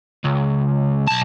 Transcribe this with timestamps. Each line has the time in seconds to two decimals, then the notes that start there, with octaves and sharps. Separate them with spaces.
0.25 C#2
1.08 B1 A5